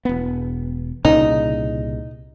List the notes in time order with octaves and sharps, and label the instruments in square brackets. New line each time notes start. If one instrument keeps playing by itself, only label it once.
[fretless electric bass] E1 B3
[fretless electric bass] C2 A#2 C#3 [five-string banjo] D#4